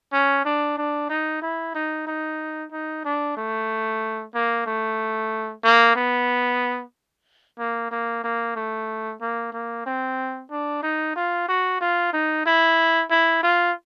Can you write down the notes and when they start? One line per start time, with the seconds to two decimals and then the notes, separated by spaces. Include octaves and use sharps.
0.13 C#4
0.45 D4
0.78 D4
1.10 D#4
1.42 E4
1.75 D#4
2.07 D#4
2.72 D#4
3.05 D4
3.37 A3
4.35 A#3
4.66 A3
5.64 A#3
5.96 B3
7.59 A#3
7.91 A#3
8.24 A#3
8.56 A3
9.21 A#3
9.53 A#3
9.86 C4
10.51 D4
10.83 D#4
11.16 F4
11.48 F#4
11.81 F4
12.13 D#4
12.46 E4
13.11 E4
13.43 F4